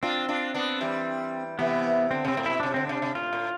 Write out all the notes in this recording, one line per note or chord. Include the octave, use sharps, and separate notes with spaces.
C4 D4 F4
D4 F4
B3 D4
E3 G3
C3 E3 B3
D3 C4
C3 C4
A2
B2 E4
C3 D4
D3 C4
C3 D4
C3
A2 F4
A2